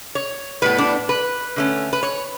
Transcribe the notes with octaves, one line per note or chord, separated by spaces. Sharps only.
C#5
A2 G3 B3 B4
D4
B4
D3 A3 C#4
B4
C#5